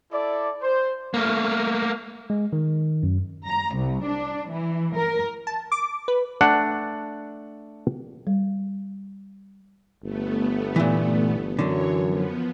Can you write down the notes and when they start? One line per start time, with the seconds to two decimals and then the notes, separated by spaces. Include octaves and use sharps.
0.11 E4 A4 D5
0.61 C5
1.14 A3 A#3
2.30 G#3
2.53 D#3
3.03 F#2
3.45 A#5
3.75 C2
4.05 D4
4.49 E3
4.95 A#4
5.47 A5
5.72 D6
6.08 B4
6.41 A3 D4 F#5
8.27 G3
10.02 G1 A3 B3
10.76 A#2 E3
11.59 F#2 D3 E3 F#3 C#5
12.05 F3 B3